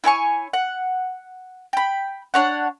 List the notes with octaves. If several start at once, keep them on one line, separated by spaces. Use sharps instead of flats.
E4 C#5 G#5 C#6
F#5
G5 B5
D4 C#5 F#5